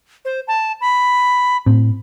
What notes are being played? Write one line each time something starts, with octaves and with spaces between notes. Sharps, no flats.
C5
A5
B5
A2 C4